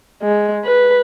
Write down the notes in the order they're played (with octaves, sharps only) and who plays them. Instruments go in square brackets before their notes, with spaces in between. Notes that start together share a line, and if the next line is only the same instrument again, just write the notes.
[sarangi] G#3
B4